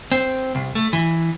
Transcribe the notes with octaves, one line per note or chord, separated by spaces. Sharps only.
C4
C2
A3
E3